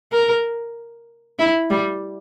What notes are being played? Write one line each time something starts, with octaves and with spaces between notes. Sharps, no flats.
A#4
E4
G3